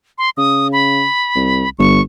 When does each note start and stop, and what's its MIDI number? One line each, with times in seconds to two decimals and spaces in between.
0.18 0.30 84
0.37 1.05 49
0.37 0.68 87
0.73 1.69 83
1.35 1.64 36
1.79 2.00 31
1.79 2.01 85